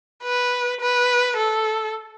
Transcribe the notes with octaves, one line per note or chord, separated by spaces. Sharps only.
B4
B4
A4